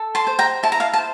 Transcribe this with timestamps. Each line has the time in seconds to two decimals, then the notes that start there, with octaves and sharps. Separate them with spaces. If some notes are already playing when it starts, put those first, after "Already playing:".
Already playing: A4
0.15 A5 C6
0.27 C5
0.39 G5 A#5
0.63 E4 A5
0.72 A#5
0.80 F5 A5
0.93 A5
0.98 C5